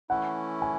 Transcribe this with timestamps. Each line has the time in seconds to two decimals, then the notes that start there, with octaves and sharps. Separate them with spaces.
0.10 E3 A3 C#4 E4 F#5
0.62 G#5